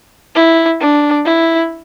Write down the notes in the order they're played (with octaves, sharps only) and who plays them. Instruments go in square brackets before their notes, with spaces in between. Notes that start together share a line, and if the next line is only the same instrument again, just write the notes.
[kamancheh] E4
D4
E4